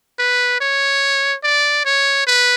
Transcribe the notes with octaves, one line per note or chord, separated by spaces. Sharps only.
B4
C#5
D5
C#5
B4